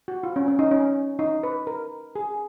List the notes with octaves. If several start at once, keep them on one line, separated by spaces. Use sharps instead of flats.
F#4
F4
C#4
C#4
D#4
C#4
D#4
B4
A#4
G#4